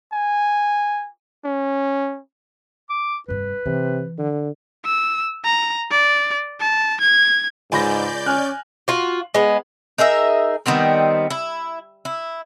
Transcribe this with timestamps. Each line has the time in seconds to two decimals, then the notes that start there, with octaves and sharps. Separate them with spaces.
0.12 G#5
1.44 C#4
2.90 D6
3.28 F1 G2 B4
3.66 C3 E3
4.18 D3
4.85 E6
5.45 A#5
5.91 D5
6.60 A5
7.01 G#6
7.72 C#2 G#2 D5 G#5 B5 G6 A#6
8.26 C#4 G#5 F6 F#6
8.88 F4 F#4
9.34 G#3 B3
9.98 D#4 G#4 A#4 E5
10.66 D#3 G3 B3 C4
11.30 E4
12.05 E4